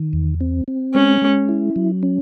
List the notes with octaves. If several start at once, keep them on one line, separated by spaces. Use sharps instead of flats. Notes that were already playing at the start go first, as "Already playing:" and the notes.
Already playing: D#3
E2
C4
C4
G#3 C#4
G#3
E4
F#3
C#4